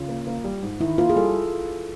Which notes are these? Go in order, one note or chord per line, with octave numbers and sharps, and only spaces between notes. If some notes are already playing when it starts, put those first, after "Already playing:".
Already playing: C#3 F4
A#3
A#3
G3
G#2
D#3 E4
A#3 F4
G#4
G3 A4